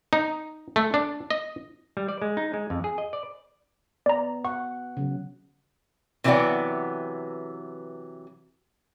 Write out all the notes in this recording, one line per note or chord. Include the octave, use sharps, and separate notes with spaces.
D#4
A3
D4
D#5
G3
D5
G#3
D#4
G#3
F2
G#4
D#5
D5
B3 D5 A#5
F#5 C#6
C#3 F#3
C3 E3 F#3 B3 D5 F#5